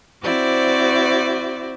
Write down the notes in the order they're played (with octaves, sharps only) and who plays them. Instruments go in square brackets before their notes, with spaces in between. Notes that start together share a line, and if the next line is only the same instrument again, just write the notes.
[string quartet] C4 E4 F#4 C5 D5 D6